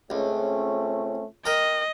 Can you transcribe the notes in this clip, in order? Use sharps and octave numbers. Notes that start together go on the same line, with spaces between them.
C#2 A3 C4 C#4
A#4 D#5 G5